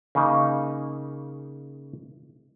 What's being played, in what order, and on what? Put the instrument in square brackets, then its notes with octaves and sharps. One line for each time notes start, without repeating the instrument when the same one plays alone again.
[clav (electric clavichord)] C#3 A#3 D#4